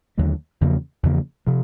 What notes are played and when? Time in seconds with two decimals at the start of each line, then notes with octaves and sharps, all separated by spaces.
0.17 D#2 D3 F#3 A3
0.61 E2 C#3 F3 A#3
1.03 E2 C#3 F3 A#3
1.47 C3 F3